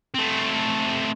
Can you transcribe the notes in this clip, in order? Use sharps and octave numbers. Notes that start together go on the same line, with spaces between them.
A3 C4